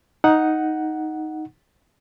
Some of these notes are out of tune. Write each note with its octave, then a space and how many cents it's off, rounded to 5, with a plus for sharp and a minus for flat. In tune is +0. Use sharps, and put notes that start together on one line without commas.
D#4 +5 F#5 +0